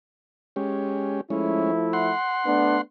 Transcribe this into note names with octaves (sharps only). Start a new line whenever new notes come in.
G#3 C#4 G4
F3 G#3 A3 C#4 E4
F#5 C6
A3 B3 D4